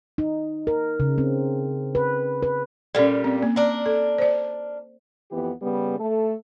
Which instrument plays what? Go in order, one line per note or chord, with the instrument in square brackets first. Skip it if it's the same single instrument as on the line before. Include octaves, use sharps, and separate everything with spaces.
[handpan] D#4
A#4
C#3
C4
B4
B4
[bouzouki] A#2 G3 [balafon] C#4 A4
[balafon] C4
A#3
[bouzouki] D4 A#4
[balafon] A4
C5 D5
[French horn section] F2 E3 B3 G4
C#3 G3 B3
A3 A4